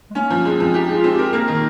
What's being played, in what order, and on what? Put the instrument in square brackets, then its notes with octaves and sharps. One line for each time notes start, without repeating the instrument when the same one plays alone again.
[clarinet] G#3
[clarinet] A#3 [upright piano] C#4
[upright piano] F3
[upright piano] G#3 [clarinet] C4
[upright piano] F3
[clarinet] D#4 [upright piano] G4
[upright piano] G#3
[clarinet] F4
[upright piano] C4
[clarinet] G4
[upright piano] A#4
[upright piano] A#3 [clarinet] A#4
[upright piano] D#3